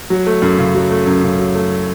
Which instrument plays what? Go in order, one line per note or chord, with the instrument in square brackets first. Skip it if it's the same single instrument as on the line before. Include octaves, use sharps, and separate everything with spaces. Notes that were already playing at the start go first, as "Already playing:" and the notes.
[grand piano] F#3
A3
F#2
C#3
F#3
A3
F#2
C#3
F#3
A3